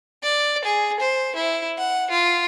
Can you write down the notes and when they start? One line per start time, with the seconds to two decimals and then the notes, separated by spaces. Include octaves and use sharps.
0.23 D5
0.64 G#4
1.00 C5
1.35 E4
1.78 F#5
2.10 F4